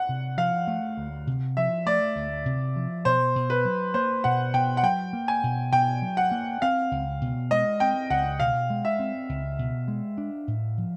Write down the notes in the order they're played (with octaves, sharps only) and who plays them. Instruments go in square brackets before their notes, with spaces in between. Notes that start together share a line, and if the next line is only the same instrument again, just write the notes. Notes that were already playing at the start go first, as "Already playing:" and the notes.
Already playing: [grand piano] F#5
[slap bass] C3
[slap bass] F3 [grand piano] F5
[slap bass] A3
D2
C3
[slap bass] F3 [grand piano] E5
[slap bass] A3 [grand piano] D5
[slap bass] D2
C3
F3
[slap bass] B2 [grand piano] C5
[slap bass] B2
[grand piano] B4
[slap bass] F#3
[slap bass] A#3 [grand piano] C5
[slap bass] B2 [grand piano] F#5
[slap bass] B2 [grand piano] G5
[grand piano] F#5
[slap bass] F#3 [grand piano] G5
[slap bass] A#3
[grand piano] G#5
[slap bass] B2
[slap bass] B2 [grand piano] G5
[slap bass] F#3
[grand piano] F#5
[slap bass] A#3
[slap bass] C4 [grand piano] F5
[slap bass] C#2
B2
[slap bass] G#3 [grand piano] D#5
[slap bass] C4 [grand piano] G5
[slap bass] C#2 [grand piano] F#5
[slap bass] B2 [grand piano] F5
[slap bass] G#3
[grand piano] E5
[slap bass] C4
C#2
B2
G#3
D4
A2
F3